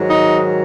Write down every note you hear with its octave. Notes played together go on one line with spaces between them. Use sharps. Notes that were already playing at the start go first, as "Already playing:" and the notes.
Already playing: G#2 D#3 F#3
D#4